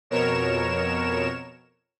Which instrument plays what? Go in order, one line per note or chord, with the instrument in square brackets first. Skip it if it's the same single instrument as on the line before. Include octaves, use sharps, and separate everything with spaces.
[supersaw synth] F2 B2 A#4 C#5 E7